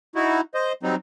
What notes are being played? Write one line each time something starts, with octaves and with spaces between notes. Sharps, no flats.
D#4 E4 F#4
C5 D#5
F#3 G3 C4 D#4